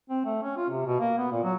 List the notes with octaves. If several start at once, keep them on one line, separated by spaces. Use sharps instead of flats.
C4
A3
C#4
F4
C3
B2
A#3
B3
A#2
F#3